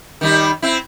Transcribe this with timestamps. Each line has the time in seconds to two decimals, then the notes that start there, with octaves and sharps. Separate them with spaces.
0.21 D#3 G3 D#4
0.62 C4 E4